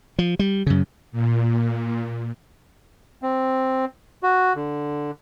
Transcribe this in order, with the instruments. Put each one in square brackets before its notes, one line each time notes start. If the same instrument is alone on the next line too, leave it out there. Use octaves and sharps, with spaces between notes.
[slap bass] F3
G3
F#2 C#3
[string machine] A#2
[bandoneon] C4
F#4
D3